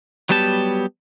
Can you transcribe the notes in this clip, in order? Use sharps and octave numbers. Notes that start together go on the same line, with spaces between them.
F#3 G3 B3 G4 A5